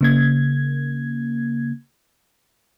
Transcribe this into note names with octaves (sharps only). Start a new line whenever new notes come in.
C#3 A#3 G#6